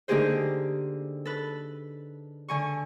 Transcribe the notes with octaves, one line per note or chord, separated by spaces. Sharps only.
D3 A#3 D#4 G4 G#4 C5
A4 B4
D3 G#5 C#6